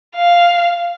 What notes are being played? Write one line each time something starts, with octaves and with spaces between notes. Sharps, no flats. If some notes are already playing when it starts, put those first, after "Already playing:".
F5